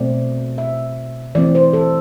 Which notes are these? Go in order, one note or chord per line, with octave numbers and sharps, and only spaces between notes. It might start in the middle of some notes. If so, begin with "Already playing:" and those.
Already playing: B2 A3 C4 D5
E5
E3 A3 C4 D5
C5
A4